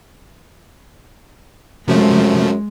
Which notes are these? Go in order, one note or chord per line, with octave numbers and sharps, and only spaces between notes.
F#2 C3 F3 G#3 A3